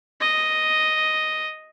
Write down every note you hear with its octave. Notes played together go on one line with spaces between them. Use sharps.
D#5